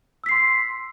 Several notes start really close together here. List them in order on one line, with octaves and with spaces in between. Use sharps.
E6 B6 C7 C6